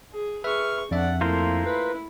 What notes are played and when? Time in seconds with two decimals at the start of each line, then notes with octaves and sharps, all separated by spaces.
0.13 G#4
0.44 G#4 B4 E5 C#6 F6
0.91 F2 D4 D5 E5 F#5
1.21 A3 A#3 E4 F4 A#4 C5
1.65 E4 B4